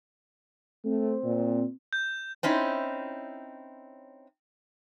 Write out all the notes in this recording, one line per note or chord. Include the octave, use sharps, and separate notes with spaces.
A3 C4
A#2
G6
C4 C#4 D#4 E4